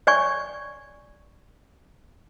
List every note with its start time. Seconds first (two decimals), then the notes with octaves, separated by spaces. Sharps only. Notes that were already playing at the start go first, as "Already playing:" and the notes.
0.07 C#5 D5 G#5 C#6